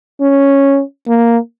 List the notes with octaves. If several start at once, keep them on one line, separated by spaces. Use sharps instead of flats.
C#4
A#3